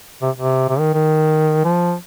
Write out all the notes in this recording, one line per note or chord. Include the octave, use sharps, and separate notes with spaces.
C3
C3
C3
D#3
D#3
F3